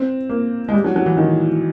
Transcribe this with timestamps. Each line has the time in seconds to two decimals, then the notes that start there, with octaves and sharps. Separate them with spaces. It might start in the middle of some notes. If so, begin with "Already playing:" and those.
Already playing: C4
0.29 A#3
0.69 G#3
0.74 G3
0.84 F#3
0.96 F#3
1.06 E3
1.17 D#3